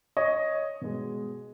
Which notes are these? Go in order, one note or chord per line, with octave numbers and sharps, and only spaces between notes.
C#5 D#5
B2 G#3